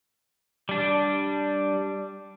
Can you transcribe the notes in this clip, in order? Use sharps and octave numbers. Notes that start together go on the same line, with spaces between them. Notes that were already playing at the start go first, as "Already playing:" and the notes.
G3 D4